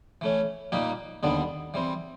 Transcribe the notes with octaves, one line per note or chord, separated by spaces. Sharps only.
E3 A3 C#4
A#2 G3 A#3 D#4 G4
D#2 D3 G3 B3 D4
E3 G3 C4